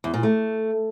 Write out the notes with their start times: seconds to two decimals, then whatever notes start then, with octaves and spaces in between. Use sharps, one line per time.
0.04 E2
0.14 A#2
0.23 A3